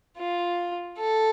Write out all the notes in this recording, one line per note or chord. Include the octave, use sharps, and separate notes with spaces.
F4
A4